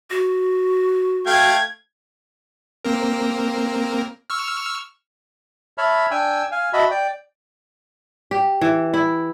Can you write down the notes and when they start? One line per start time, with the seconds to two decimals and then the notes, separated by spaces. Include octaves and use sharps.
0.10 F#4
1.26 A3 F5 G5 G#6
2.85 A#3 C4 A#4
4.30 C#6 E6 F6
5.78 C#5 E5 A5 B5 F6
6.11 D4 G5 G#5 E6
6.51 F5 G#5
6.73 F#4 D#5 E5 A5 B5
6.91 D5 G5
8.31 G4
8.61 E3
8.94 E4